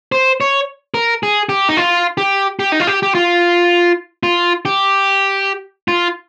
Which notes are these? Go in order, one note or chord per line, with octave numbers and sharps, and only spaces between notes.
C5
C#5
A#4
G#4
G4
D#4
F4
G4
G4
D#4
F4
G4
G4
F4
F4
G4
F4